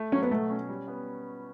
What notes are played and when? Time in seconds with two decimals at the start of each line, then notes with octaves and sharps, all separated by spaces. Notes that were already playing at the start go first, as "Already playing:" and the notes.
Already playing: A3
0.12 F#3 C#4
0.23 B3
0.31 B2 A3
0.50 C#4
0.69 G3
0.88 B3